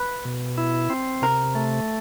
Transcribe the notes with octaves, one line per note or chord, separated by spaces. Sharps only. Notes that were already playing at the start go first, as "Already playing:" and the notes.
Already playing: B4
B2
E4
C4
C3 A#4
A3